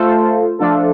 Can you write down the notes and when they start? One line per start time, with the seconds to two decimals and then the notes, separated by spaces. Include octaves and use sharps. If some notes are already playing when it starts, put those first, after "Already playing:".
Already playing: A3 F4 A4 C5
0.59 F3 A3 D4 F4 A4